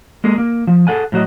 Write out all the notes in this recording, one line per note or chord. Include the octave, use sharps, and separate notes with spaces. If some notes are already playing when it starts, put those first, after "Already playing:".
G#3 A#3 G#4
A#3
F3
G#4 A4 F#5 G#5
A2 F#3 F#4 D#5